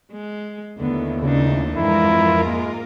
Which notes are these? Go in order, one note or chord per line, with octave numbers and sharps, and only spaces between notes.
G#3
D#2 D3 A3 B3 E4
C#2 C#3 A#3 D4 D#4
F2 G#2 E3 E4 F4 A#4
G#3 A#3